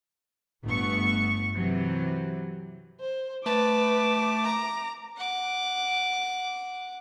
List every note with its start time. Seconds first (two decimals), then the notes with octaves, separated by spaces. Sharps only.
0.65 G1 A3 B3 C#6
1.54 C3 E3 F#3
3.00 C5
3.46 A3 B4 A5 D6
4.44 A#5
5.16 F#5 D6